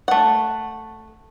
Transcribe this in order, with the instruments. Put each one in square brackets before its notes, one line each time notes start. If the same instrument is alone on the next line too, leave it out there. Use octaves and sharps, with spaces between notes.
[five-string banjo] A3 F#5